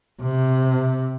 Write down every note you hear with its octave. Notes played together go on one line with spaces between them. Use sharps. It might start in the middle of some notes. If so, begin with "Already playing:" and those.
C3